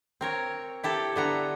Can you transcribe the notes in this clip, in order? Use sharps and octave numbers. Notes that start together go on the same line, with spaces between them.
C4 A#4 C#5
E4 G4 A4
D3 B3 A#5